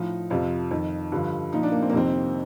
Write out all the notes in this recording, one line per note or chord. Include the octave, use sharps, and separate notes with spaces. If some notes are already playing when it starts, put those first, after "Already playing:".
Already playing: A2 F3 D#4
F2 C3 F3 F4
F2 D#3
G2 D3 F3
A#2 F3 D#4
D4
A#3
C4
A#3
F2 C3 D#3 C4